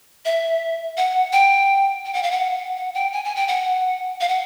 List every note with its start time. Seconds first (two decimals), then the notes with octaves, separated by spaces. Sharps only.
0.25 E5
0.97 F#5
1.33 G5
2.05 G5
2.14 F#5
2.23 F5
2.31 F#5
2.77 F#5
2.94 G5
3.13 G#5
3.25 G#5
3.36 G5
3.48 F#5
4.21 F5
4.28 F#5